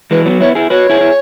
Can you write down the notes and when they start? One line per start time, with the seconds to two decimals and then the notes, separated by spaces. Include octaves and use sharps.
0.11 E3 G#3 B4
0.25 F#3 B3
0.40 B3 E4 C#5
0.55 E4 G#4
0.70 F#4 B4 C#5
0.89 E4 G#4
1.01 E4